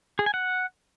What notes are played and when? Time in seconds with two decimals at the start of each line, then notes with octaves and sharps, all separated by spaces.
0.19 G#4
0.26 G#5
0.34 F#5